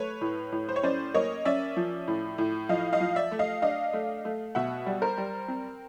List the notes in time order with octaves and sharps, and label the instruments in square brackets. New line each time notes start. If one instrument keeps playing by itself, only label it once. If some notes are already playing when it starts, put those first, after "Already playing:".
Already playing: [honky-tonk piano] A3 B4 C#5
A2
A2
C5
C#5
C#4 C5 D5
A#3 C#5 D#5
C#4 D5 E5
F3
A2
A2
F3 D#5 F5
D#5 F5
F3
D5 E5
A3
D#5 F5
D4 D#5 F5
A3
A3
B2 E5 F#5
G3
A#4 C5
G3
C4